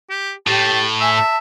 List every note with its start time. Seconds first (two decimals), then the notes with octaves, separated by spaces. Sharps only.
0.10 G4
0.47 A2 G4 A5
1.01 E5 G#5
1.15 A5